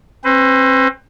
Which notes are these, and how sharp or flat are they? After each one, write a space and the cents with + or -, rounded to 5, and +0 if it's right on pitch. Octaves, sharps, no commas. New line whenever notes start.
C4 +35 B4 +40